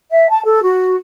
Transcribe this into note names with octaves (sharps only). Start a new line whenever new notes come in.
E5
A5
A4
F#4